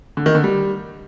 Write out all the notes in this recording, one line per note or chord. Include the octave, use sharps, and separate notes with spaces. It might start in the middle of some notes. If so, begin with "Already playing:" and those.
D3
D#3
D3
G3